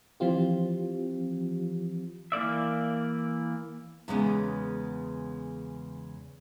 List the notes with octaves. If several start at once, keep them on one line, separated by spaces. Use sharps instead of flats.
E3 F3 C4 F4 G4
E3 A#3 D5 E5
E2 C#3 G#3 A3 B3 C#4